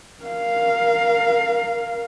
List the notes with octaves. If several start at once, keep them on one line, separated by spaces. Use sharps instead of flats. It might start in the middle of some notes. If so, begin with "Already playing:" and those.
A#4 F5